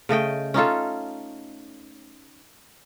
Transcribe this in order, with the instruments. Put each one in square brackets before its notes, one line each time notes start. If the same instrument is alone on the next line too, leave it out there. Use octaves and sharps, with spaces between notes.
[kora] C#3 A3 D#5 G5
C#4 D#4 F4 A4